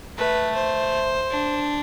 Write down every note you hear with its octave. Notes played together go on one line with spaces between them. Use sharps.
A3 B4
C5
D4